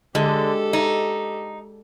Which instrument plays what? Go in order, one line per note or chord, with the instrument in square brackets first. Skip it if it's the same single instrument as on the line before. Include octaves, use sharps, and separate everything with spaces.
[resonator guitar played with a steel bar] D3 [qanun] G#3 [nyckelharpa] G4 A4
[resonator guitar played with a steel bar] D#4